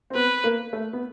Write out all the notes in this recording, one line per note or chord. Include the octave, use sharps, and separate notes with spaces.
C4
B3 B4
A#3
A3
B3